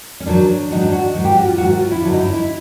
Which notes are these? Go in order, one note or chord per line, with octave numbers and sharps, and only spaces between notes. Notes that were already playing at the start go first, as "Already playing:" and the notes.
C#4
G#2 D#3 F#3 D4
G#2 D#3 F#3 D#4
D4
F#4
G#2 D#3 F#3
G4
F#4
F4
G#2 D#3 F#3 F#4
F#4
F4
E4
G2 D3 F#3 D4
D#4
E4
E4